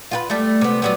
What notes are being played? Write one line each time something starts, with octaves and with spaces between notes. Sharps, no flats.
F4 G4 B4
G3 A3
C3 B3
F#3 G3 B3